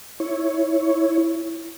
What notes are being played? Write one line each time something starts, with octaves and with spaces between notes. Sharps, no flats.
E4 C#5